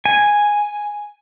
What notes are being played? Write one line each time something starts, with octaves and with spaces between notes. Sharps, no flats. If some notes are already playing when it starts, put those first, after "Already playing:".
G#5